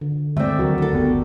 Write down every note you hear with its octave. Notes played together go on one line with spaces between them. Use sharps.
D3
D#3 G#3 A3 C4 D5 E5
D2 F#3 F#4 A#4
D3 A4
F#1 B3 G4